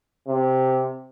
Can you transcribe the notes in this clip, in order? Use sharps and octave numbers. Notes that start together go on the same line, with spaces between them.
C3